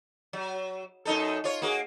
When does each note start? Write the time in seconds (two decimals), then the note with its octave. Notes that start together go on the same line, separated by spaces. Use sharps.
0.33 F#3
1.05 F#2 D#4 A4
1.44 F4 C#5
1.62 A#3 F#4 G#4